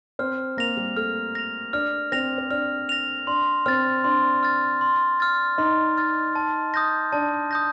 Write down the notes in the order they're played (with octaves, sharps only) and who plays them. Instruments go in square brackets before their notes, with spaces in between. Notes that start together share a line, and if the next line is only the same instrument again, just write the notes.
[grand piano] C4 C5 [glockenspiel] F6
[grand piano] A#3 A#4 [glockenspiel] A#6 F7
[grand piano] G3 G4
[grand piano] A3 A4 [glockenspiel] F6
[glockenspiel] A#6 F7
[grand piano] D4 D5 [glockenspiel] F6
[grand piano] C4 C5 [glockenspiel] A#6 F7
[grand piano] C5
[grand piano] D4 D5 [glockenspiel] F6
[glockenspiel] A#6 F7
[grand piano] D4 D5 [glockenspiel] C6
[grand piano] C4 C5 [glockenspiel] F6 A6
[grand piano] D4 D5 [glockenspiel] C6
[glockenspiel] F6 A6
C6
F6 A6
[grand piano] D#4 D#5 [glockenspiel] C6
[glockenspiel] F6 A6
A5
D#6 G6 A#6
[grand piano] D4 D5 [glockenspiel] A5
[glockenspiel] D#6 G6 A#6